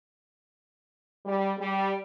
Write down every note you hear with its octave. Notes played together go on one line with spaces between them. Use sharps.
G3
G3